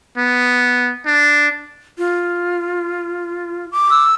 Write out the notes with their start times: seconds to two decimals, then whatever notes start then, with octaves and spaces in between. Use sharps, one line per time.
0.17 B3
1.06 D4
1.98 F4
3.72 D6
3.91 E6